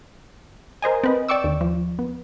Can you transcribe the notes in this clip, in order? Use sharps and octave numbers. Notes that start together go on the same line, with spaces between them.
A#4 C5 D#5 G#5
C4 B4 D#5
D5 G5 C#6 D6 E6
D#2
F3
B3